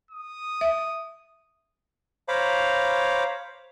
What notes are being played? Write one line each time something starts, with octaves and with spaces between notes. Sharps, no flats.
D#6
E5
C5 C#5 F5 A#5 B5 D6